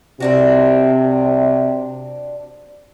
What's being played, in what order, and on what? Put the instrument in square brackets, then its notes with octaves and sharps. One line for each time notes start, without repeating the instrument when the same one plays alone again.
[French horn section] C3 [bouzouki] C4 D4 F#4